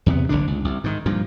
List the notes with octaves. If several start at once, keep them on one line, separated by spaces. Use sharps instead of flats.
E2 C3 A3 B3
F1 B1 D3 D4
C#2
C2
G#2 D#3
G2 A#2 F3